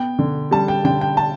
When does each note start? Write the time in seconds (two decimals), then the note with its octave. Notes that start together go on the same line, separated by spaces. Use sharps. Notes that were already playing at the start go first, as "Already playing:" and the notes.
Already playing: B3 G5
0.19 D3
0.51 G3 A5
0.68 G5
0.84 D3 G5
1.01 G5
1.17 A5